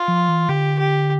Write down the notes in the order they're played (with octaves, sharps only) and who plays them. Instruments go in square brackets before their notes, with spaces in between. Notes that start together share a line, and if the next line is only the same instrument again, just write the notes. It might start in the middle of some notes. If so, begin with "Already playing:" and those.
Already playing: [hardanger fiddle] F4
[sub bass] F3
E3
[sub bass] D3 [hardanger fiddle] G4
[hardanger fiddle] G4